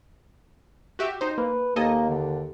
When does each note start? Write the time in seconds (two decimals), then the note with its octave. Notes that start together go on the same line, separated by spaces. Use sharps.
0.99 F#4 G4 E5
1.21 D#4 C5
1.38 A#3 B4
1.76 D#2 A#3 A4 D#5 G#5
2.10 D3